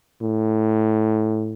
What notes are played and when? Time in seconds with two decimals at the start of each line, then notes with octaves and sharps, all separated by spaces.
0.21 A2